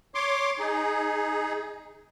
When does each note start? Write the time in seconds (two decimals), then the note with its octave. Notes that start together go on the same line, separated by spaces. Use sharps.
0.15 C#5 C6 D6
0.59 D#4 G#4